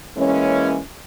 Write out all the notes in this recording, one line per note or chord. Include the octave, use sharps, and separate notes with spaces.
E3 G#3 A#3 C#4